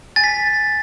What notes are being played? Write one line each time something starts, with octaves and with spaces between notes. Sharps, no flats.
G#5 A6
B6